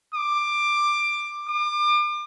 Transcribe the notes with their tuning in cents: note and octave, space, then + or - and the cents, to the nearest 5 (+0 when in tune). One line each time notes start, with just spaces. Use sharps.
D6 +15
D6 +35